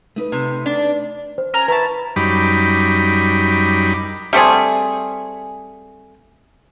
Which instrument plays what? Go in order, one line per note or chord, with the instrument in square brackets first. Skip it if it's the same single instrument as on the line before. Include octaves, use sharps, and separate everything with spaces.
[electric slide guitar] A3 D#4 B4
[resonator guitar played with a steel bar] C3
D4
[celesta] C5
[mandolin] C#4 A#4 A#5
[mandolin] E4 A5 [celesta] B4 A#5 C#6
[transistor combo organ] F#2 G3 D#4 B5 D6
[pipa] G3 A3 C4 G#4